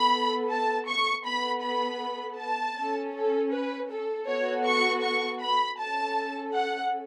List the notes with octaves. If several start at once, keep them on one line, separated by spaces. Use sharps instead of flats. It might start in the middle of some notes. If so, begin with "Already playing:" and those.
Already playing: B3 A4 B5
A5
C#6
B3 A4 B5
B5
A5
C#4 A4
A4
B4
A4
B3 F#4 A4 C#5
C#6
C#6
B5
C#4 A4 A5
F#5